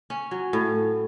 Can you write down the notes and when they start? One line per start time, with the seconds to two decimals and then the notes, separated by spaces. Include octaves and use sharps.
0.10 C#4
0.31 F#3
0.53 A2